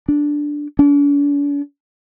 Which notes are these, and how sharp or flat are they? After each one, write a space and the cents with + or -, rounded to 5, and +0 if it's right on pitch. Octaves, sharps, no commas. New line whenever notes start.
D4 +0
D4 -45